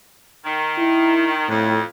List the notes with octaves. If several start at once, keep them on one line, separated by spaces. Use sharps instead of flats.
D#3
E4
F2 A2